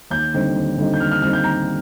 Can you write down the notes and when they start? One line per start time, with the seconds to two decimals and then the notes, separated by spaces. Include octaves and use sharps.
0.11 D#2 G6
0.34 D3 G3 C4 D#4
0.56 D#2
0.78 D3 G3 C4 D#4
0.94 G6
1.00 D#2 F6
1.11 F6
1.22 D3 G3 C4 D#4 F6
1.33 G6
1.44 D#2 A#5